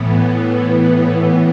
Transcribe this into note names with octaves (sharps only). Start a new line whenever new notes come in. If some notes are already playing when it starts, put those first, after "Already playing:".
Already playing: A2 E3 B3
B3